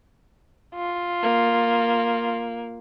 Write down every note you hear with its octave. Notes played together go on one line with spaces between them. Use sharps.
F4
A#3